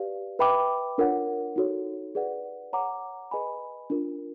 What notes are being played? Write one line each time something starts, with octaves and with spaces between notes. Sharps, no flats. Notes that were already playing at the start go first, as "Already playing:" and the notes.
Already playing: G4 B4 D5 F5
B4 E5 G5 B5 D6
D4 F4 A#4 C#5 F#5
D#4 F#4 A4 C#5
G#4 B4 D5 F#5
C#5 F#5 A#5 D6
G#4 B4 D#5 G#5 B5
D4 F4 A#4